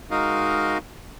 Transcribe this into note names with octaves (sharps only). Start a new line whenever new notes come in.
G#3 D#4 F#4 A#4 D#5 F5